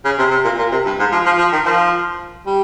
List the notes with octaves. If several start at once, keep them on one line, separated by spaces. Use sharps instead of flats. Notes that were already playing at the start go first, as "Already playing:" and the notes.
C#3
C3
C3
A#2
A#2
C3
G2
G#2
F3
F3
F3
D#3
F3
G3